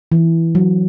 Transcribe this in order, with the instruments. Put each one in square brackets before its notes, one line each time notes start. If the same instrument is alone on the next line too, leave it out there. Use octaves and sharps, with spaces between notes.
[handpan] E3
F#3